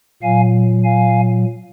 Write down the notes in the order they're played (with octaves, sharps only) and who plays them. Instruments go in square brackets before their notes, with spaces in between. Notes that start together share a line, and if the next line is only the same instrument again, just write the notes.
[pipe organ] A#2 F#3 F5 G#5
F5 G#5